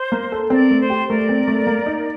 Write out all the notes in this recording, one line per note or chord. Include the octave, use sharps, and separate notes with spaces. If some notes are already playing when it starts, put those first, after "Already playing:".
Already playing: C5
A#3
A4
C4 A#4 D5
A3
C5
G4
A3 A#4 D5
C4
A3
A#3
D#4